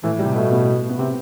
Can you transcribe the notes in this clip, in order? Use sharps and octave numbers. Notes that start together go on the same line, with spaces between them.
A2 E3
G3
C3
B2 A3
B3
B3
C3 C4